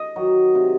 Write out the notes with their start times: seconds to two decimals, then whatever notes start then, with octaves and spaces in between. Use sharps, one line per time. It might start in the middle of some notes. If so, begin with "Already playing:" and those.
Already playing: D#5
0.16 D#3 F#3
0.55 C3